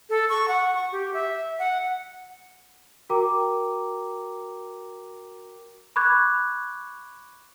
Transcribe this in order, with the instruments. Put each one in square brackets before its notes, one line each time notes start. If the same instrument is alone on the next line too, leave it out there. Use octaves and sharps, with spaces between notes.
[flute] A4
C#6
F#5
C#6
G4
E5
F#5
[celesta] F#4 A#4 G5 A#5 D6
B5 C#6 D6 F#6 G#6